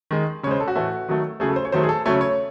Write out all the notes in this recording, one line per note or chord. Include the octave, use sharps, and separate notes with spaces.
D#3 G#3
C#3 G#3 C5 C#5
A4
F#4
A2 E3 A3
D#3 F#3 A3
C#3 F#3 A3 G#4
A4
C5
C#5
D#3 F#3 A3 C5
G#4
A4
C#3 F#3 A3 C#5
C#5